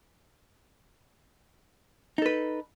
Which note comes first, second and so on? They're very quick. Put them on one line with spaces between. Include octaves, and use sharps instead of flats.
D#4 A4 B4